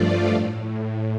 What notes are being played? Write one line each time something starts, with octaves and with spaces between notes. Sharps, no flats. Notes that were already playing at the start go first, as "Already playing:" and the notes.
Already playing: G2 F3 A3 F4 D5
A2